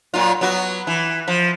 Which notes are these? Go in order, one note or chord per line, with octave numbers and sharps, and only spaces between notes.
A#2 F#3 F4
F#3 B3 F#4
E3
F3